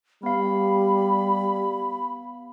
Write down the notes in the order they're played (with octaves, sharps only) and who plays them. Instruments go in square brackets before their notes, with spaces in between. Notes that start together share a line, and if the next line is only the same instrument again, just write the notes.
[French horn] G3 [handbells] B3 F5 [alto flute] B5